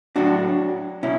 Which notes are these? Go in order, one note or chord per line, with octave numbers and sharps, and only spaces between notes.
A2 F#3 D4 F#4
B2 C#4 E4